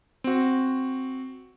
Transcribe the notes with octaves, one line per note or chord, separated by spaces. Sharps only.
C4 F#4